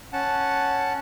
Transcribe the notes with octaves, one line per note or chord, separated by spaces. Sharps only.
C#4 F#5 A5